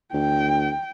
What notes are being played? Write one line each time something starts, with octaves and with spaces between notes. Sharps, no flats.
D2 G5